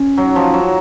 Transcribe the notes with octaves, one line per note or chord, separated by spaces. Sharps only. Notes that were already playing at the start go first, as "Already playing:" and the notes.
Already playing: C#4
F#3
F3
F#3